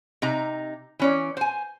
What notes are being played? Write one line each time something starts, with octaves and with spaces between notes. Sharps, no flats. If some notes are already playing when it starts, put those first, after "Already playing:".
C3 D#4 A#5
E3 C#4 D5
C5 G#5